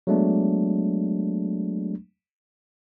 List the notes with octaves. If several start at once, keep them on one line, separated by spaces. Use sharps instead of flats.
F#3 G#3 A3 B3 D4